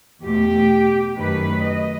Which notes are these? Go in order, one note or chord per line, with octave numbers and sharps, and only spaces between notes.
E2 B2 A3 G4
F#2 D#3 A3 B4
D#5